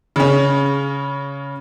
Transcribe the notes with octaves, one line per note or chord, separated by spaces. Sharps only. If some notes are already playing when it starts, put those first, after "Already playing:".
C#3 C#4